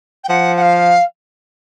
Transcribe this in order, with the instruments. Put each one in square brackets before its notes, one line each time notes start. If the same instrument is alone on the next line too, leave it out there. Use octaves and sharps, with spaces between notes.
[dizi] G5
[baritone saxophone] F3 [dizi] F#5
[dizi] F#5
F5